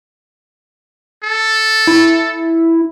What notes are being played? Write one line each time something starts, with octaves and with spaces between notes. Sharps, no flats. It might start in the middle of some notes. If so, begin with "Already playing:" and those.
A4
E4